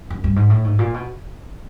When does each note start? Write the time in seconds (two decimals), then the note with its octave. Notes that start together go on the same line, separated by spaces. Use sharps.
0.10 F#2
0.24 G2
0.36 G#2
0.50 A2
0.65 G#2
0.79 A#2
0.94 B2